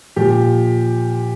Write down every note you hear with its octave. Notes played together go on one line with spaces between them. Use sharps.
A#2 F3 G4